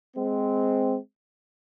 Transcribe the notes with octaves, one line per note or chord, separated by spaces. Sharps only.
G#3 C4